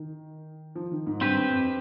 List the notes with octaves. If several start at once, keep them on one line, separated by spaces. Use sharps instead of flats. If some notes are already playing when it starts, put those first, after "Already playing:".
Already playing: D#3
F3
D#3
G#2
G2 C4 G4 B4
F2